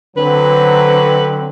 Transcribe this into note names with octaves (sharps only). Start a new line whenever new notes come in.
D3 F#3 C4 B4